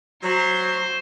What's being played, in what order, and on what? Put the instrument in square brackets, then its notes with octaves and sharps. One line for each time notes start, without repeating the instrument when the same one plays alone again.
[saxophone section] F#3 [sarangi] C5